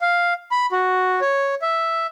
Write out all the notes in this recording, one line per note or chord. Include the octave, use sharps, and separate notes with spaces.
F5
B5
F#4
C#5
E5